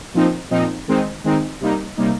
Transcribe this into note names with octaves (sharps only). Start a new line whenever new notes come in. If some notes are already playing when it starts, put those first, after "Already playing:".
A#2 F3 C4 D#4
A#2 F3 C4 D#4
D#3 G#3 C4 D#4
D#3 G#3 C4 D#4
C3 G3 A#3 D#4
C3 G3 A#3 D#4